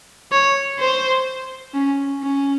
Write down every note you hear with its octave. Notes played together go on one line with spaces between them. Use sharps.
C#5
C5
C#4
C#4